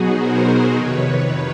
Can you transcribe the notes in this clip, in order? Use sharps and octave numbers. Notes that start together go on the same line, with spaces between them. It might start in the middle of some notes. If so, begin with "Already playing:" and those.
Already playing: B2 F#3 B3 D#4 F#4 G#4
A#4 C5
F2 C3 D#3 B4 C#5